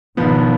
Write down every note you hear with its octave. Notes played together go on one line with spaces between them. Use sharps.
G#1 G#2 B2 D#3 F3 B3